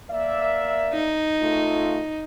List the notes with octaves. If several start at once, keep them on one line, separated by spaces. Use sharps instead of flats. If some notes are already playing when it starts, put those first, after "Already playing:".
A#3 D5 E5
D#4
C#2 A3 F4